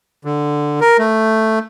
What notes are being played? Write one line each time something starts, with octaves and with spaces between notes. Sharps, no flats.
D3
A#4
A3